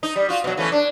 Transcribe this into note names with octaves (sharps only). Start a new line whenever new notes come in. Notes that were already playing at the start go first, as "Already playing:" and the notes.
D#4
G3
F4 F#4
B2 F#3
E3 A3 C#4
D4